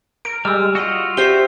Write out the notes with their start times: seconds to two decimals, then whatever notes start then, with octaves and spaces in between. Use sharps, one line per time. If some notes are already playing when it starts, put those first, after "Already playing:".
0.25 A#4 D7
0.45 G3 G#3 E6 F6
0.75 F4 F#4 D#5
1.17 G4 C5 E5 C7 G7